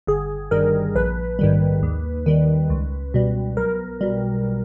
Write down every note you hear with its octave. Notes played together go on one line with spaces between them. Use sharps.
G1 G#4
G2 D#3 G3 A#4
A#1 B4
G#2 D#3 G3
D#2
D#3 G3
C#2
B2 G3
B1 A#4
B2 G3